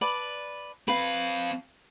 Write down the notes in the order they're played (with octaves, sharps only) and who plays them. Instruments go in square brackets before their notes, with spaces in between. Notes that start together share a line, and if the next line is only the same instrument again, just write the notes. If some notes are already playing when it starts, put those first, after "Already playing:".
[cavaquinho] B4 D5 A5
[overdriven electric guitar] C4 F5 [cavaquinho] B4